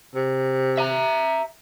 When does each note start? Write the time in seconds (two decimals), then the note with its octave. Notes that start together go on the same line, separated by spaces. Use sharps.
0.15 C3
0.77 E5 A#5